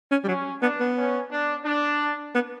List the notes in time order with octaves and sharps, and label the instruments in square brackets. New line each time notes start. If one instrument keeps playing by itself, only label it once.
[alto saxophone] C#4
G3
[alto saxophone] F#3 [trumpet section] C#4
[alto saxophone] B3 [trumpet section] D4
[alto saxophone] B3
[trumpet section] C#4
D4
D4
[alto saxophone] B3